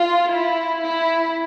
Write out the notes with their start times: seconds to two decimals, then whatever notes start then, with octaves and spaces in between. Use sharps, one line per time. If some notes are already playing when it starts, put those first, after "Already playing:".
Already playing: F4
0.31 E4
0.84 E4